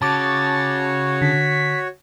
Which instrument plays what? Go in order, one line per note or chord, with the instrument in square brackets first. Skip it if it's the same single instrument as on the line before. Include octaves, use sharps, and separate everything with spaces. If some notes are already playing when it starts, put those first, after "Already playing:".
[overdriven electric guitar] C#3 [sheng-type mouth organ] F#4 C#5 [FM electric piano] A5 D6 [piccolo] A6
[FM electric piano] D3 [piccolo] B6